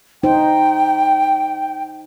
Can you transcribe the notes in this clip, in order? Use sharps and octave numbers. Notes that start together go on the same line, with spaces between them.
D#4 C5 G5